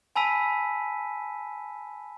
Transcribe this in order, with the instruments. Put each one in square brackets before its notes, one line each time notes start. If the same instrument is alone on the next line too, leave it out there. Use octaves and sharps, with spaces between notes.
[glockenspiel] G#5 A5 B5 E6 B6 D#7